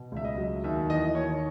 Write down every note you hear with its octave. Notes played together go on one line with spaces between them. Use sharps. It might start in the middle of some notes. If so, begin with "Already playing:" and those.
Already playing: B2
C#2 E5
D#5
F#3
D#2 E5
E3 D#5
D#2 C#5